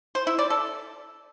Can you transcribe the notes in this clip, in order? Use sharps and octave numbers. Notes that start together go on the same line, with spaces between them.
C5
E4
D5
A4